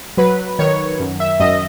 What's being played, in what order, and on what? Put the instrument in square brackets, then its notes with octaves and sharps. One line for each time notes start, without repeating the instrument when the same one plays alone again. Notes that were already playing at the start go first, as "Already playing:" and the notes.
[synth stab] F#3 B4
D#3 C#5
F#2
E5
F#2 D#5